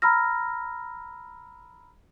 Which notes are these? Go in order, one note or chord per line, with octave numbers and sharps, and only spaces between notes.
A#5 B5 E6 F6 A#6